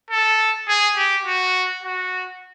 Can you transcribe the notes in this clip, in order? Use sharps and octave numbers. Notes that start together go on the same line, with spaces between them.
A4
G#4
G4
F#4
F#4